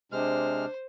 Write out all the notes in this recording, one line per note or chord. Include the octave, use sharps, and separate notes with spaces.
C3 G#3 D4 C5 F6